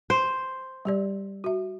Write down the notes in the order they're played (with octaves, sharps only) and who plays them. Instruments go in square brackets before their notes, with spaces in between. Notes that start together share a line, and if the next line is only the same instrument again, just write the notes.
[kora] C5
[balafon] G3 G4 D5
F#4 E5